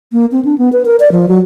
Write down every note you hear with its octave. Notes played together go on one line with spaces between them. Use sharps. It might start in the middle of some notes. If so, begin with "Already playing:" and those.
A#3
C4
D4
B3
B4
A#4
D5
F3
F#3